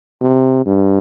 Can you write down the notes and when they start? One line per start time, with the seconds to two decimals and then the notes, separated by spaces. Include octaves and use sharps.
0.21 C3
0.66 G2